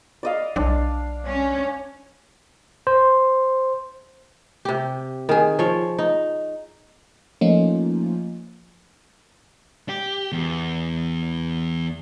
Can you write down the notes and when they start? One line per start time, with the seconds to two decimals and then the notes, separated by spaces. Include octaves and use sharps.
0.23 D5 D#5 F5
0.56 B1 D4
1.26 C#4
2.87 C5
4.65 C3 G4
5.29 D#3 G#4
5.59 F3 C#5
5.99 D#4
7.41 F3 A3 A#3 C#4 D#4 F4
9.89 G4
10.32 E2